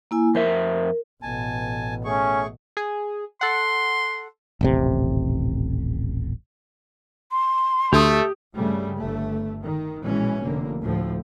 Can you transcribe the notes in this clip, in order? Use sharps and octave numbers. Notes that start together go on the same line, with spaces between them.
A#3 E4 G#5
F2 A#4 C5 E5
A1 B2 G#5 A5
A3 C#4 G#4 C#6
G#4
A4 F#5 C6
D#1 A1 C3
C6
D2 A3 G4 D#6
G2 C#3 G3 A3
G1 A3
D#3
A#1 B2 E3 G#3 C#4
F1 D3 A#3
D2 A2 F3